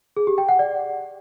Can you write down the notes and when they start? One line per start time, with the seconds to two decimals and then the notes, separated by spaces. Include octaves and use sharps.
0.17 G#4
0.27 G4
0.38 G5
0.49 F#5
0.59 D5